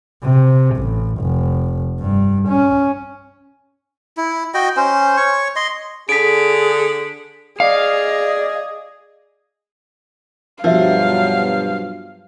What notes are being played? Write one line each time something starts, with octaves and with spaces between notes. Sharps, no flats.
C3
A1
F1
G2
C#4
E4
F#4 D#5 G5
C#4 C5
C#5 C#6
D#5 C6
D3 G#4 B6 D7
G#4 D5 D#5 F5
G2 B2 F3 F#3 A#4 E5 F5